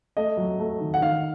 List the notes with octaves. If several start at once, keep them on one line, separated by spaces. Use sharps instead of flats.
A3 D#5
F#3
A3
D#3
F#5
D#3 F5